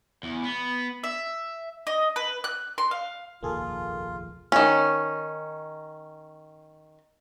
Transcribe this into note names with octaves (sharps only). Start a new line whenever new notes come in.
E2
B3
E5
D#5
B4
F#6
C6
F5
F1 A#1 D#2 A#3 F4 G#4 A4
D#3 C#4